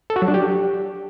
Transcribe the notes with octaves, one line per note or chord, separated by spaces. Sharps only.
A4
F#4
F#3
D4
G4